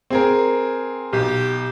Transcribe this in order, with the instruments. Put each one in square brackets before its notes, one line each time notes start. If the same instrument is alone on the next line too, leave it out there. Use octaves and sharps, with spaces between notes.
[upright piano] C4 G#4 A#4
[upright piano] B1 [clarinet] G4